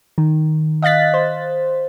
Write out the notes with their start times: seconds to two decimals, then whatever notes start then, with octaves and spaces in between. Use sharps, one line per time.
0.18 D#3
0.82 D#5 F5 F#6 A6 B6
1.14 C5